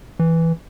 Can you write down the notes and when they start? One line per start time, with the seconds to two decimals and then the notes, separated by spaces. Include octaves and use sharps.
0.19 E3